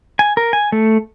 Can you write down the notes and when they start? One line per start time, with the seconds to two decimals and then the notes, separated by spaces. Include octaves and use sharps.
0.19 G#5
0.37 A#4
0.53 G#5
0.72 A3